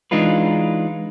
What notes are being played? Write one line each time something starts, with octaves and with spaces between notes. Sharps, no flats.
E3 G#3 D4 D#4 F4 B4